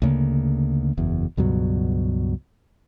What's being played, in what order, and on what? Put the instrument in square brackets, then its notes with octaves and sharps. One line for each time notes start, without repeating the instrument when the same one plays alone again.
[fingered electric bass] D2 C#3 A#3
F#1 E2
C#2 G2 B2 F#3